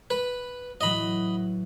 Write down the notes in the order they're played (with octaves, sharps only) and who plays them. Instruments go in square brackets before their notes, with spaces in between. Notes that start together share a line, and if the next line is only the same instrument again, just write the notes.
[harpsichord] B4
[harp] A2 E3 F#3 [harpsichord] D#5 B5